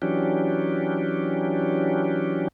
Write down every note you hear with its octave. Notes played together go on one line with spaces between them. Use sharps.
E3 F#3 C#4 D4 G4